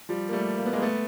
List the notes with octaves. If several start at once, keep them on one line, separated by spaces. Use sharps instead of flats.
F3 G3
A#3
G3 A3
A#3
B3
G#3 A#3
A3 B3